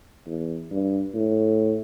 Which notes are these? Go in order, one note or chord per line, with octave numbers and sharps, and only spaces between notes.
E2
G2
A2